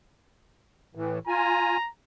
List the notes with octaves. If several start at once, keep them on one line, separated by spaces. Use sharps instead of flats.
A2 E3
F4 G#5 A#5